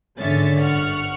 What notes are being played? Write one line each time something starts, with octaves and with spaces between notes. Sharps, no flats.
G#2 D3 C#4 C#5 E5 A6
G1 F#5 C#6 F6